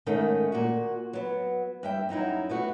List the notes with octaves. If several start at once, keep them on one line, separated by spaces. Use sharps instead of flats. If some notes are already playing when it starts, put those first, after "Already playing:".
G#2 D#3 A3 C#4
A#2 F#4
F#3 B3
G2 E5 G5
F#2 F#3 D#4 E4
A3 B3 F#4